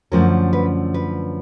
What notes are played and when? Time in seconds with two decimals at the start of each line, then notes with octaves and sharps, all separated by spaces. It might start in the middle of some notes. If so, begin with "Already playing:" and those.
0.12 F#2 D3 F3 A3 C#4 A#4
0.53 B4
0.94 B4